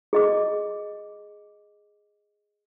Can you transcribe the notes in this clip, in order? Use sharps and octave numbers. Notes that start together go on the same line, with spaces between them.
G#4 D#5 D6